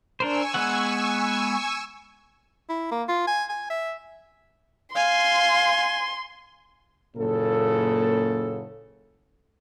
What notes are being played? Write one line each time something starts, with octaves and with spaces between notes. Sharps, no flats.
D4 A#4 C5 G#5 C#6 E6
G#3 B3 F#5
E4
A#3
F4
G#5
G#5
E5
F5 G#5 C6
F#1 A#2 C#3 A4